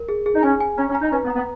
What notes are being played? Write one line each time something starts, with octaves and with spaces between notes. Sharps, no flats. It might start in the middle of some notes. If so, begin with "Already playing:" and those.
Already playing: A#4
G#4
G#4
D#4
C#4 G#5
G#5
C#4 A#5
C#4
A#5
D#4
C#4 B4
B3
A#5
B3